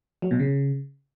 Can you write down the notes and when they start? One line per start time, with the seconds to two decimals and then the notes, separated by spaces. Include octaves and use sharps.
0.22 F#3
0.31 B2
0.40 C#3